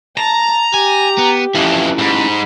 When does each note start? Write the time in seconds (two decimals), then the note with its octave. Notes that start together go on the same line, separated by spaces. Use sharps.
0.17 A5 A#5
0.74 G4 G#5
1.18 B3
1.55 F2 E3 C#4 E4
1.99 G#2 B5